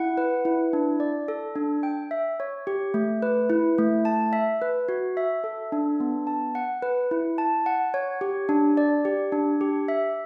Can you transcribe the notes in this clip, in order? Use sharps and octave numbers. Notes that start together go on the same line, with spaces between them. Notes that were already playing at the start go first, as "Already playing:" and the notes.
Already playing: E4 F#5
B4
E4
D4
D5
A4
D4
G5
E5
C#5
G4
A3
B4
E4
A3
A5
E5
B4
F#4
E5
A4
D4
B3
A5
F#5
B4
E4
A5
F#5
C#5
G4
D4
D5
G4
D4
G4
E5